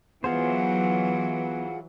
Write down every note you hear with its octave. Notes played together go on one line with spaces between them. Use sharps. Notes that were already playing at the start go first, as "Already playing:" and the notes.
E3 F#3 B3 F4 G#4 C5 F#5